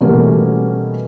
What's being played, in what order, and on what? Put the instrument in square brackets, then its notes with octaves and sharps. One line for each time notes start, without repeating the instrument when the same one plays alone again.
[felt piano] B2 E3 G3 A3 A#3 C#4